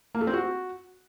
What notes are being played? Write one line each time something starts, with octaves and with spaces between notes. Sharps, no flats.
A#3
A3
C4
F#4